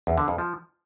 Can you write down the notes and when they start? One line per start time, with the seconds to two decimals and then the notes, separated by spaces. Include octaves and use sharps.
0.07 E2
0.18 D3
0.28 F2
0.38 F3